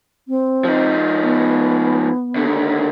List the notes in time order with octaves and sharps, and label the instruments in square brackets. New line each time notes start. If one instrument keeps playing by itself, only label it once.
[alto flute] C4
[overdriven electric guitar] F3 D#4
[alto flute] B3
[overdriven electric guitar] D#2 D3